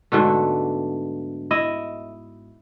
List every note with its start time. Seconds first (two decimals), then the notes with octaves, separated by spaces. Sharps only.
0.12 G#2 B2 D3 A3
1.51 E4 D#5